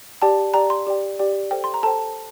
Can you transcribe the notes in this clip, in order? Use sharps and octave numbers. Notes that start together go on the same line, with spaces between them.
G4 D5 G5 A5
G4 D5 G5 A#5
C6
G4 D5 G5
G4 D5 G5
A4 C5 G5
C6
A#5
A4 C5 G5 A5